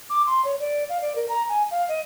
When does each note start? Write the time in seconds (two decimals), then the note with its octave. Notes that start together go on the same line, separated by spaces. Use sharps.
0.10 D6
0.27 C6
0.45 C#5
0.60 D5
0.89 F5
1.02 D5
1.16 A#4
1.29 A#5
1.49 G#5
1.71 F5
1.89 D#5